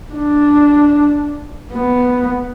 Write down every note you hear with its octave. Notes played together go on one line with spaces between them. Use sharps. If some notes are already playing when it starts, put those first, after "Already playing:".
D4
B3